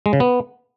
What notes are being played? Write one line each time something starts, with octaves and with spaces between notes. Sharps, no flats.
G#3
C#3
B3